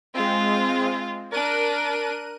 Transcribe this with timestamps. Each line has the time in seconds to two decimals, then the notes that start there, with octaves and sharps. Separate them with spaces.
0.14 G#3 C4 F4
1.32 D4 A#4 F#6 D#7